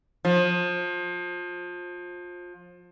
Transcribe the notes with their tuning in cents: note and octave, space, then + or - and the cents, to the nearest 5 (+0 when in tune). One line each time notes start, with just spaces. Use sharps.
F3 +25